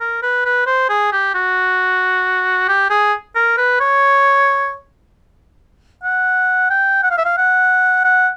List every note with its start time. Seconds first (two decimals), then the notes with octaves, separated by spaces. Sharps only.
0.01 A#4
0.23 B4
0.45 B4
0.67 C5
0.89 G#4
1.12 G4
1.34 F#4
2.68 G4
2.90 G#4
3.35 A#4
3.57 B4
3.80 C#5
6.03 F#5
6.70 G5
7.03 F#5
7.11 F5
7.18 E5
7.25 F5
7.37 F#5
8.04 F#5